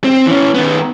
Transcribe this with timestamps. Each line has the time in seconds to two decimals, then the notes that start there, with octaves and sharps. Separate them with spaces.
0.04 C4
0.27 E3 C#4
0.54 D#3 B3